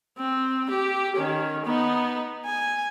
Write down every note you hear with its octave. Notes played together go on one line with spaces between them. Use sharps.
C4
G4
D#3 C#4
B3 D#4
G#5